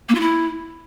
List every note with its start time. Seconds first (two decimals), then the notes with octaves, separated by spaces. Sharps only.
0.09 A#3
0.15 F4
0.20 E4